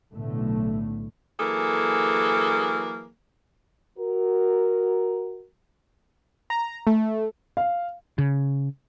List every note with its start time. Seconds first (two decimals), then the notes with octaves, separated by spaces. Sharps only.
0.13 B1 A2 D3 A3
1.39 E3 F#3 A#3 G#4 A4
3.98 F#4 A#4
6.50 A#5
6.87 A3
7.57 F5
8.18 C#3